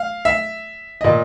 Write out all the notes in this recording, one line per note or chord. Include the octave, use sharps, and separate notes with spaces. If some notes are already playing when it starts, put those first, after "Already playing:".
Already playing: F5
E5
A#2 D#5